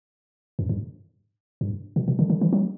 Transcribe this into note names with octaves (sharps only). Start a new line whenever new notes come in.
F#2
G2
G2
B2
B2
D3
D3
E3
F#3